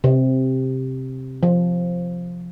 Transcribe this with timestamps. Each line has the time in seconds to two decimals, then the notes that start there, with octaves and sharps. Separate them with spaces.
0.04 C3
1.43 F3